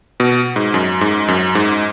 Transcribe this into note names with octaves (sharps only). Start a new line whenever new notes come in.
B2
G#2
F#2
G#2
F#2
G#2